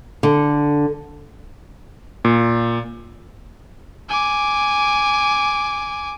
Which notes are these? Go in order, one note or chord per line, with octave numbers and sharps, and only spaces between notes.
D3
A#2
G#5 D6